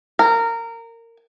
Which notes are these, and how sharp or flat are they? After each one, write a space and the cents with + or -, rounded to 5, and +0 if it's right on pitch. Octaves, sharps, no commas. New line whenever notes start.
A#4 -20